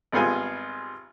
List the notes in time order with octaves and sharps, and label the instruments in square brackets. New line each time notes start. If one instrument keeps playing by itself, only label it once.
[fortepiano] G#1 G3 B3 F4 G#4 G#5